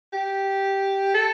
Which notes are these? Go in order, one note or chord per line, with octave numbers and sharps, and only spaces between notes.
G4
A4